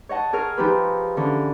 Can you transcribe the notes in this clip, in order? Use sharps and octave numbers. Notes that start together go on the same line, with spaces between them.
C#5 D#5 F#5 A5
G#4 A#4 C#5 F6
F3 D#4 G4 B4
D3 E3 C#4